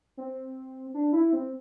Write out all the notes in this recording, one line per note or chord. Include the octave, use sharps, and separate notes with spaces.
C4
D4
E4
C4